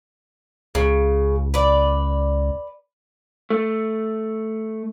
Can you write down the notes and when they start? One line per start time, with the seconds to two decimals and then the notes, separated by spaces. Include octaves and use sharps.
0.75 C#2 C#3
1.54 B4 D5
3.50 A3